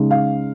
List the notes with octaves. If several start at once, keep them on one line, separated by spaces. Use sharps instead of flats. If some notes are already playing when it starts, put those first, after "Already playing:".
Already playing: C#3 G#3 D#4
F5